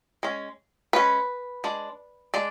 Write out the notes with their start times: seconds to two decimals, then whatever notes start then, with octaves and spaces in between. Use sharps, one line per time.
0.23 G#3 C#4
0.93 G#3 C#4 B4
1.64 G#3 D4
2.34 G#3 D4 D5